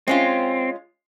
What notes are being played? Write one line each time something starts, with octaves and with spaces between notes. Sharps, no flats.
G#3 C4 C#4 F4